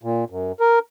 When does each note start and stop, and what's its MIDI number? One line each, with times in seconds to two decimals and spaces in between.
0.03 0.25 46
0.30 0.52 42
0.60 0.79 70